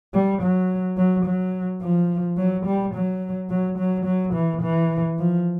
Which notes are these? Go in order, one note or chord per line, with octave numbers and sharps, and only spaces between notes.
G3
F#3
F#3
F#3
F3
F#3
G3
F#3
F#3
F#3
F#3
E3
E3
F3